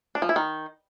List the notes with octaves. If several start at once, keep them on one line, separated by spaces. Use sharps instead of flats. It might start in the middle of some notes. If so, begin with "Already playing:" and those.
D4
F3
E4
D#3